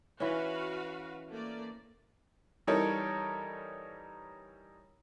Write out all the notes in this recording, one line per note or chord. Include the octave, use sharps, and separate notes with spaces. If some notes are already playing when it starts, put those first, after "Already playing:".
E3 C#4 F#4 B4 F5
A3 A#3 D5
E3 G3 D#4 A4 A#4 C#5